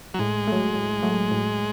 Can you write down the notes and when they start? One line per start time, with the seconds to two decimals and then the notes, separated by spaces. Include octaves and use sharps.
0.14 F#3
0.19 A2 G#3
0.47 F#3 A3
0.75 A2
1.02 F#3 A3
1.31 A2